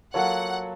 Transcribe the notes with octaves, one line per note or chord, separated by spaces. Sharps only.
F#3 A#3 F4 A4 C#5 F#5